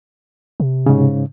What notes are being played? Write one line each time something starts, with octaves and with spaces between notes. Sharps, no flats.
C3
G#2 C#3